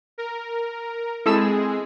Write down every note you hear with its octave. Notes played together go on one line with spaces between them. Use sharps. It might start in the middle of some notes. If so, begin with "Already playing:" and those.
A#4
G#3 C4 E4 G#4 A4 E6